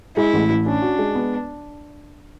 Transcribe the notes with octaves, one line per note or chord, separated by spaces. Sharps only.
G#3 E4
A1
A1
C#4 D4
F#4
G#3
B3